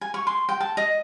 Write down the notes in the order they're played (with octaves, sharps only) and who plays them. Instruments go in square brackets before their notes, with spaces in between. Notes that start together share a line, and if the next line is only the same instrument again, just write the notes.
[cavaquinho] G#5
C#6
C6
G5
A5
D#5